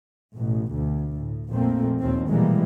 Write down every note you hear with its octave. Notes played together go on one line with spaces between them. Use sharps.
A1 B2
D2
A2
A#1 F2 A#2 A3 A#3 C4
D#2 A#2 D#3 C4
A#1 B2 E3 G3 G#3 A#3